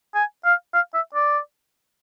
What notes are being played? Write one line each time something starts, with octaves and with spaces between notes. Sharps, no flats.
G#5
F5
F5
E5
D5